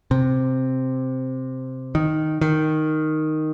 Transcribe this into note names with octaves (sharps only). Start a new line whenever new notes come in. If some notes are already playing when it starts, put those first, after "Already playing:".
C3
D#3
D#3